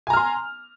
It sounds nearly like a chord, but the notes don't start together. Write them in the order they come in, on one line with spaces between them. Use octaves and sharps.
G#5 A#5 F6 C6